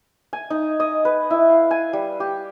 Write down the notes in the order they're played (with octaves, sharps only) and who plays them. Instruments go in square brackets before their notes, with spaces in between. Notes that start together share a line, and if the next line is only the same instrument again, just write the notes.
[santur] G#5
D#4
D#5
B4
E4
F5
G#5
G3
G4